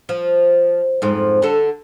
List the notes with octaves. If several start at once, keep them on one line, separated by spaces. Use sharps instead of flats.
F3
F2 G#2 F3
D3 A4